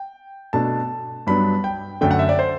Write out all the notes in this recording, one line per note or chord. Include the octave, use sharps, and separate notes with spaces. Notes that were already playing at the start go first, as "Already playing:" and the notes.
Already playing: G5
B2 A3 D4 A5
G2 F#3 B3 D4 B5
G5
F#2 D3 A3 D4 G5
F#5
E5
D5
C5